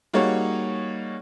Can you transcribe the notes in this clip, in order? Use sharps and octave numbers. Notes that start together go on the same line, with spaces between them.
G3 A#3 D#4 F#4 G#4 C#5